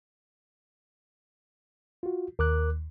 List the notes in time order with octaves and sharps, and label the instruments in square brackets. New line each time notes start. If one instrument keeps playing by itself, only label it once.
[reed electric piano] F4 F#4
[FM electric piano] D#2 [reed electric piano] A#4 D6 F#6